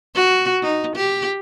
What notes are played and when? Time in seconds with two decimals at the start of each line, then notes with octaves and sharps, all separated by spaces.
0.15 F#4
0.62 D#4
0.96 G4